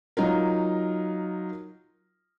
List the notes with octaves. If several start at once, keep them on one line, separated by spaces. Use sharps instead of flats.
F#3 D#4 F4 A#4